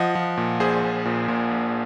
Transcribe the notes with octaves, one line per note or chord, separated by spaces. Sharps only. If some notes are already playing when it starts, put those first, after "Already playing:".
Already playing: F3 D#5 F#5
F3
A#2
A#1 G#4 C5
A#1
A#2
A#2
A#1